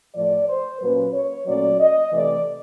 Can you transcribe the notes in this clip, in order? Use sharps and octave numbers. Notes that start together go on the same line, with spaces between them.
A2 F3 A3 D5
C5
A#2 F#3 A#3 C#4 B4
C#5
A#2 F#3 A3 C#4 D5
D#5
C3 E3 A3 D5